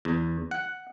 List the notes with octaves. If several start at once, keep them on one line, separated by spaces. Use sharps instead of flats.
E2
F#5